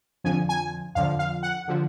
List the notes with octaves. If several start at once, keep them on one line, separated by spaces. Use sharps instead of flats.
F2 D3 F3 G#5
G#5
F2 D3 F3 F5
F5
F#5
D3 F3